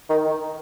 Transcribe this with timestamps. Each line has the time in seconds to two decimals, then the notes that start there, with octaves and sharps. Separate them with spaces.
0.10 D#3